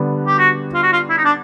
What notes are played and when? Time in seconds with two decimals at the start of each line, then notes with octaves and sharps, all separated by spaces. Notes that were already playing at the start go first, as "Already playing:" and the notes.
Already playing: D3 G3 B3 D4
0.27 G4
0.38 F#4
0.74 F4
0.83 F#4
0.92 F4
1.09 E4
1.17 D#4
1.24 D4